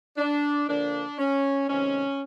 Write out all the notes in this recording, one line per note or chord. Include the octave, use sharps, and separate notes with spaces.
D4
D3 F3 A#3 D4
C#4
C3 D#3 G#3 C4 C#4